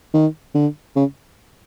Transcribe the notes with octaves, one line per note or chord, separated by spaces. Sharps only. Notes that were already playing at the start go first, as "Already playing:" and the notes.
D#3
D3
C#3